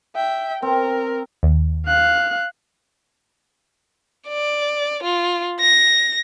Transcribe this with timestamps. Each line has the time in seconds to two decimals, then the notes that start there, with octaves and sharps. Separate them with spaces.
0.15 E5 G5
0.62 C4 A#4
1.43 D#2
1.86 F5 F#6
4.28 D5
5.03 F4
5.60 A#6